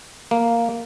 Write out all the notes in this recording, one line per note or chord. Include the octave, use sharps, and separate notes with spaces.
A#3